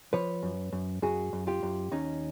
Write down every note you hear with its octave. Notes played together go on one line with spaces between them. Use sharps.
F3 B4 C#5
F#2
F#2
F#2 F#4 G#4
F#2
F4 G4
F#2
D#2 C#4 D#4